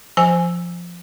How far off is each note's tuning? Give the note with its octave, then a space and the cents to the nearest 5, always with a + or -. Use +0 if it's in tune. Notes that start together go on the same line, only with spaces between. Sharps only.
F3 +0 C5 -5 G#5 +0